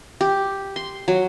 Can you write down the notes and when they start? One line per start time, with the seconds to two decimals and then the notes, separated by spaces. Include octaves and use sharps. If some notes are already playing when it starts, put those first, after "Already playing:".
0.21 G4
0.76 C6
1.08 F#3